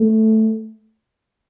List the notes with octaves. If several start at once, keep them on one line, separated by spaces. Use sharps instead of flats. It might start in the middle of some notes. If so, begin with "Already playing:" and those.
Already playing: A3